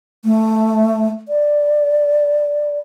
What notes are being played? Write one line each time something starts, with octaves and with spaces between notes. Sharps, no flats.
A3
D5